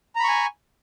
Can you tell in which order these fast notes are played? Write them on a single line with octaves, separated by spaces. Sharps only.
A#5 B5 C#6 G#5